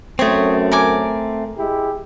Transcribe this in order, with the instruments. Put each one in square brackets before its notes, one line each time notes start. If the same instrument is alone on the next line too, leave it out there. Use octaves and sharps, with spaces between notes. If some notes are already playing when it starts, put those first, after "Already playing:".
[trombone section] F#2 [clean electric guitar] A3 C4 [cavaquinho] C#5 D#5
[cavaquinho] A#4 G#5 D6
[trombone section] G#3 E4 G4